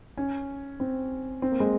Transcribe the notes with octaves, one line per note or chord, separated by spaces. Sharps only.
C#4
C4
C4
A#3
G#3